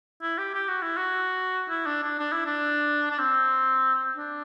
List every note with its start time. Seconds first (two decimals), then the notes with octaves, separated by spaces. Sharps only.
0.22 E4
0.38 G4
0.55 G4
0.68 F#4
0.82 E4
0.97 F#4
1.69 E4
1.86 D4
2.03 D4
2.19 D4
2.32 E4
2.46 D4
3.11 D4
3.19 C4
4.17 D4